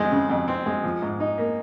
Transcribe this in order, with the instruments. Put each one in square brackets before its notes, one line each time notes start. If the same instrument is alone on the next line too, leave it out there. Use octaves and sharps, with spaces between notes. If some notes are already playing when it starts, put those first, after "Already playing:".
Already playing: [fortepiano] F2 G#3 C4
C#3
F2
C4
G#3
F3
G#2
D#4
A#3